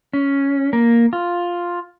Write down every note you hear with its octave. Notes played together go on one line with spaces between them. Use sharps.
C#4
A#3
F4